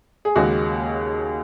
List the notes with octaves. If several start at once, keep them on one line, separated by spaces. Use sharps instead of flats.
G#4
D#2 C#3 G#3 F#4